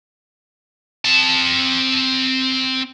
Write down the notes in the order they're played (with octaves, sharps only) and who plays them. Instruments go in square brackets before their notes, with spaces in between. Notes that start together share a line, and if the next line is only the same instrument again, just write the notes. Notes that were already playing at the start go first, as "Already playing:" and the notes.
[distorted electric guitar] C4 A5